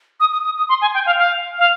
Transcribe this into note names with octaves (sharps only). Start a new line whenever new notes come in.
D#6
D#6
D#6
D#6
C6
G#5
G5
F5
F5
F5